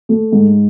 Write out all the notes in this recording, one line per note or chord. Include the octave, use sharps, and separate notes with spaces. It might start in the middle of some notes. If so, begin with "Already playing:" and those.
A3
G#2